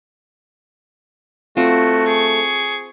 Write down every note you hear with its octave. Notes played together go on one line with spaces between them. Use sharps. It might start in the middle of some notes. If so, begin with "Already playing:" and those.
A3 C4 F4 F#4
G#4 C#6